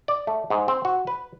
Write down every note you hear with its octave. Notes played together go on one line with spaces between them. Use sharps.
D5
A3
G#2
C4
F#4
B4